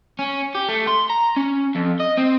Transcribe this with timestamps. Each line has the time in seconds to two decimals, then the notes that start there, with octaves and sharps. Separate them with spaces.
0.19 C#4
0.55 G4
0.68 A3
0.87 C6
1.10 A#5
1.36 C#4
1.75 F2
2.00 D#5
2.17 C4